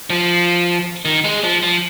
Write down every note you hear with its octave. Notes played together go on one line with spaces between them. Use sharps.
F3
D#3
G#3
F3
F3